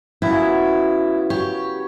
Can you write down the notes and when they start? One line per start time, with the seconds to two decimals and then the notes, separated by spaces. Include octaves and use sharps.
0.22 C#3 F#3 B3 E4
1.30 G4 C#5